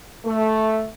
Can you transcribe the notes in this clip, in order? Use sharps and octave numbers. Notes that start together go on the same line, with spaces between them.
A3